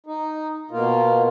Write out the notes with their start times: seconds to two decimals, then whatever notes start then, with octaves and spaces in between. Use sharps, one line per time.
0.06 D#4
0.71 B2 A#3 F4